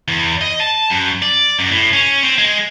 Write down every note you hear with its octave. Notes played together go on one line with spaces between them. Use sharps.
E2
D#5
A5
F#2
D5
F#2
A2
C#4
C4
G#3